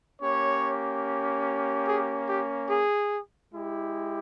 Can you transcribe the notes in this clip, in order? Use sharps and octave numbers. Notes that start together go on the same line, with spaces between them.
A#3 C#4 G4 C#5
G#4
G4
G#4
G#3 E4 G4